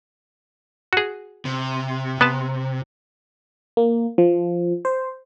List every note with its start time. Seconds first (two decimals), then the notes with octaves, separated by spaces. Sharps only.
0.93 F#4 G#4
1.45 C3
2.21 B3 B4 A5
3.77 A#3
4.18 F3
4.85 C5